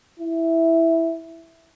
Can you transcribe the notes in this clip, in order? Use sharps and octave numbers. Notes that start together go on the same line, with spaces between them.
E4